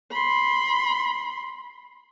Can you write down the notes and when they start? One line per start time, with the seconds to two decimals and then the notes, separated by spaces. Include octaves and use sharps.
0.12 B5 C6